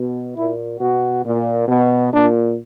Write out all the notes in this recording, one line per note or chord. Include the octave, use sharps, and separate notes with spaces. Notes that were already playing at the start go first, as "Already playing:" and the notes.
Already playing: B2
A#2 E4
B2 F#4
A#2
B2
A#2 D4